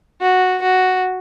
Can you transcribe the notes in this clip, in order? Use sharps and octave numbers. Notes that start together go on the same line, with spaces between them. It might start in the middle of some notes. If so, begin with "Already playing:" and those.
F#4
F#4